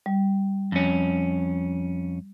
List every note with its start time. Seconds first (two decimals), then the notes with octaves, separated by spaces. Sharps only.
0.06 G3
0.72 F2 C#4